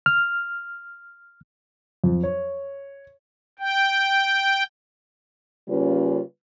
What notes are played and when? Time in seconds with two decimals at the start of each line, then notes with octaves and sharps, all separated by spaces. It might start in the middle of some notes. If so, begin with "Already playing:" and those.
0.06 F6
2.04 F2
2.23 C#5
3.59 G5
5.68 C#3 G3 A#3 C#4 F4 B4